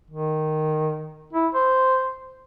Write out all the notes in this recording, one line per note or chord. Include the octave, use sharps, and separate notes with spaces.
D#3
E4
C5